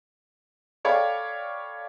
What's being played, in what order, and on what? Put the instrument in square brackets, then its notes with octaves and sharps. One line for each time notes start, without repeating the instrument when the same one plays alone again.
[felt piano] A4 C#5 D5 F5 G5 B5